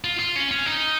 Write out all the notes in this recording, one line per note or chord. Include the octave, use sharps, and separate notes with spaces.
F4
F4
C#4
C#4
D#4